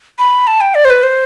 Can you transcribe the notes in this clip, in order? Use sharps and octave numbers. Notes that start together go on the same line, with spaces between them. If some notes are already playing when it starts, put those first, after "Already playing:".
B5
A5
G5
D5
C5
B4
C5